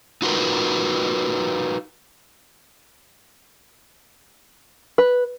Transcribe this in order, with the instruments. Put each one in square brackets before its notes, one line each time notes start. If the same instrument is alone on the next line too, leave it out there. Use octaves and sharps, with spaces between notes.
[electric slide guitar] D#4 F4 F#4 A#4 B4
[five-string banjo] B4